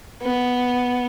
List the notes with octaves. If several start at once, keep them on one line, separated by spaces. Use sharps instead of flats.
B3